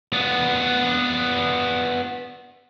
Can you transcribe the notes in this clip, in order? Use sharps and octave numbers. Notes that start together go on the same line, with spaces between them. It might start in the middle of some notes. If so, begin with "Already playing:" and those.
B3 D4